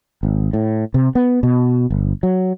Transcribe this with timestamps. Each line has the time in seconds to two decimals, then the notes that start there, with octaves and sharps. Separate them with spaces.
0.23 G#1
0.53 A2
0.94 C3
1.15 B3
1.43 B2
1.90 G1
2.23 F#3